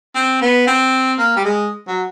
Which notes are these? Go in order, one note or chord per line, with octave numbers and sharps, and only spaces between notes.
C4
B3
C4
A#3
G3
G#3
F#3